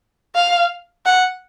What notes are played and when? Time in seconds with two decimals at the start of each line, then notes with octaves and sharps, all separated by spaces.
0.36 F5
1.06 F#5